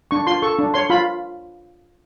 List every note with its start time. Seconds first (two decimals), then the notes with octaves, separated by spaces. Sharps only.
0.11 D4 C#6
0.27 F4 C6
0.42 A4 C#6
0.59 D4
0.74 C#5 C6
0.90 F4 B5